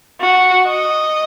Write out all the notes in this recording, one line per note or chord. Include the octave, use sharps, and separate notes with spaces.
F#4
D#5